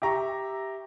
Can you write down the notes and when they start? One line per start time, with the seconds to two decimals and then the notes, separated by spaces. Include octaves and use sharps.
0.02 G4 E5 A#5 C#6